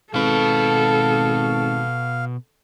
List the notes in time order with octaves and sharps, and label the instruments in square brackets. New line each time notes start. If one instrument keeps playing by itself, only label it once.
[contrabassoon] G#1 [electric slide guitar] B2 B4 [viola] A4 [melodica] F5